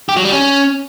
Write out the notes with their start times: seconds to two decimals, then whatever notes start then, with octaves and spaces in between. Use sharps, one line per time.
0.09 G4
0.16 F#3
0.24 G3
0.32 C#4